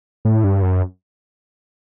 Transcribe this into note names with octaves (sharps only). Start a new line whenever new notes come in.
A2
G2
F#2